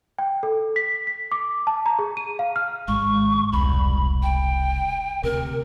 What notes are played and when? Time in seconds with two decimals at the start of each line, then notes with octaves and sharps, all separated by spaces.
0.19 G5
0.43 A4
0.76 B6
1.07 B6
1.32 D6
1.67 A5
1.86 A#5
1.99 G#4
2.17 D#7
2.39 F5
2.56 F6
2.88 G#1 G#3 C#6
3.52 E1 C2 B5
4.22 G5
5.23 D2 C3 A#4